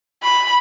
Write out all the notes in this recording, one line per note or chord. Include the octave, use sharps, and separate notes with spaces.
B5